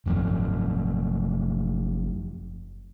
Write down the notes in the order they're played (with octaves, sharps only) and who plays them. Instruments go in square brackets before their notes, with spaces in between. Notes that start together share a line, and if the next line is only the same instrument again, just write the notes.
[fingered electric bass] F#1 F#2 C#3 F3